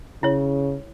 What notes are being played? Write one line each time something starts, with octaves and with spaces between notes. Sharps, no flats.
C#3 E4 C#5